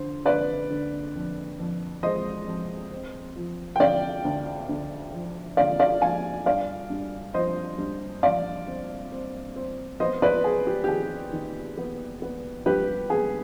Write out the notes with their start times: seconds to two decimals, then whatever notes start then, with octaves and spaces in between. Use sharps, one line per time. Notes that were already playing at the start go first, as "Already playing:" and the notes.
Already playing: D3 C5
0.26 D3 B4 D5
0.70 D3
1.15 F2
1.59 F2
2.03 G#3 C5 D#5
2.47 F2
2.91 C4
3.36 F3
3.76 G5
3.80 D2 D5 F5
4.25 D2
4.69 D2
5.13 F3
5.57 D2 D5 F5
5.79 D5 F5
6.01 F3 F5 G#5
6.46 G2 D5 F5
6.90 G2
7.34 F3 C5 D#5
7.78 G2
8.23 F3 D5 F5
8.67 C4
9.12 C4
9.56 C4
10.00 B3 C5 D#5
10.22 B4 D5
10.44 B3 G#4
10.67 G4
10.84 G4
10.89 D#3 G#4
11.33 D#3
11.77 B3
12.22 B3
12.66 G2 G4 B4
13.10 B3 G#4